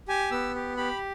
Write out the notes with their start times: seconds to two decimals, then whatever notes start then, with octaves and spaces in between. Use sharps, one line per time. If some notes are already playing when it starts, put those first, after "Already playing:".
0.08 G4 G#5
0.31 B3 E6
0.55 G4
0.77 G4 B5